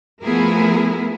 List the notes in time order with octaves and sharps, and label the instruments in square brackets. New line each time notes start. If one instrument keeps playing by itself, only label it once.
[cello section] F3 A3 B3 E4 G#4 A#4